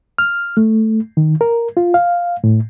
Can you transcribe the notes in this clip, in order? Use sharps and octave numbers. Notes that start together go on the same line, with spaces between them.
F6
A3
D#3
A#4
F4
F5
A2